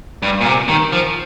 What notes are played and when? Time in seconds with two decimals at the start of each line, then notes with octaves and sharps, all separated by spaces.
0.22 G2
0.41 A#2
0.46 C3
0.68 D#3
0.93 F3